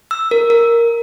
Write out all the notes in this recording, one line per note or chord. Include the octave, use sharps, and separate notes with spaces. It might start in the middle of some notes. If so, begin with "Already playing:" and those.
E6
A#4
A#4